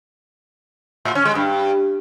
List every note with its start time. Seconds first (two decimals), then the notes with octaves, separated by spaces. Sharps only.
1.05 A2
1.15 C#4
1.25 G#3
1.35 G2